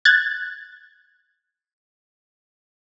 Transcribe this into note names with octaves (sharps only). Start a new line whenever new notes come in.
F#6 G#6 A6